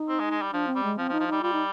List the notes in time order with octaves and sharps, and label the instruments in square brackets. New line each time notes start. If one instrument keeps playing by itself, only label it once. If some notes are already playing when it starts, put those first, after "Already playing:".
Already playing: [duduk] D#4
[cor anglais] C4
G#3
G#3
G3
[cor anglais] F3 [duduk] D4
[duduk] C4
[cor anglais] G3
[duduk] G#3
[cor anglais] F3 [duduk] C4
[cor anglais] F3
[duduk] D#4
[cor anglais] F3
[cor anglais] G3 [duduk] D#4
[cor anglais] G3 [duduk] F4
[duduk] D#4